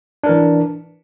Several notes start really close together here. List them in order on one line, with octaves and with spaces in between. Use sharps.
D4 A#4 E3